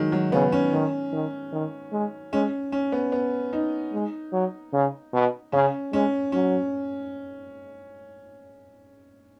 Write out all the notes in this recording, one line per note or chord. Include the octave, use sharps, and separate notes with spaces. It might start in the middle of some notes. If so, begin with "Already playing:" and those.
Already playing: D#3 F#3 G#3
F#3
C#3 B3
C#4
D#3
D#3
D#3
G#3
G#3 C#4
C#4
B3
B3
D#4
G#3
F#3
C#3
B2
C#3 C#4
G#3 C#4
F#3 C#4